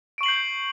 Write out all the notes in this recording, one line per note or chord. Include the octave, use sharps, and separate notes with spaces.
C#6 G6 C7 D7 F#7